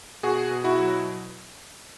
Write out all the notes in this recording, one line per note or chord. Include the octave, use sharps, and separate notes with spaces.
B2 F#4 G#4
B2
E4 F#4
F#3